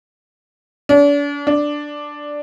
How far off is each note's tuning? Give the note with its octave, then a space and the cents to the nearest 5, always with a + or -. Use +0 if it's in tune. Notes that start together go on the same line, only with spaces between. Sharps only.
D4 -40
D4 +0